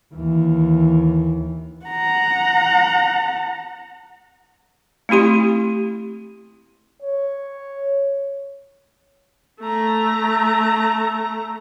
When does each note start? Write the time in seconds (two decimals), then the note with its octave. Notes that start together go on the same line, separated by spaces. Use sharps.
0.15 D#2 E3
1.86 F#5 A#5
5.09 A3 C4 E4 G4 C6
7.02 C#5
9.61 A3 A#5